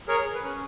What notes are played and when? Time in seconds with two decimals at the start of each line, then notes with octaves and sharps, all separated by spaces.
0.08 G#4 A#4 C#5
0.25 G#4
0.34 B4
0.43 C#4